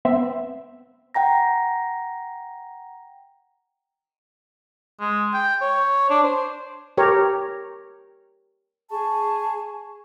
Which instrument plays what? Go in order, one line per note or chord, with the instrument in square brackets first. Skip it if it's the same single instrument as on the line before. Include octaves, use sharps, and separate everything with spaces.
[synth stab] B3 C4 E5
[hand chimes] F#5 G5 A#5 A#6
[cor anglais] G#3
G5
C#5
D4
C5
[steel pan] G4 A#4 C#5
[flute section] G#4 A5 C#6